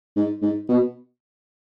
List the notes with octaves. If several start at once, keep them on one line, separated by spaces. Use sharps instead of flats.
G#2
G#2
B2